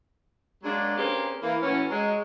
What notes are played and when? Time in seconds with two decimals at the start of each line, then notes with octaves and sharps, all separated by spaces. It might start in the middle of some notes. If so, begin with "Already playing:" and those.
0.64 F#3 G#3 A#3 D4
0.97 A#3 C4 C#4 G4 G#4 B4
1.42 E3 A#3
1.62 A2 E3 F#3 C#4
1.89 F#3 G#3